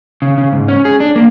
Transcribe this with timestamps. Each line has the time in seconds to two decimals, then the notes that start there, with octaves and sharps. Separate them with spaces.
0.22 C#3
0.38 C#3
0.53 G#2
0.68 C#4
0.85 G#4
1.00 D4
1.16 A#3